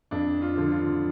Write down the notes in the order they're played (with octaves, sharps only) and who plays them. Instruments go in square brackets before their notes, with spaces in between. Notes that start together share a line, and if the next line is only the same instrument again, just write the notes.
[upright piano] F2 D4
F4
D3 F3
F4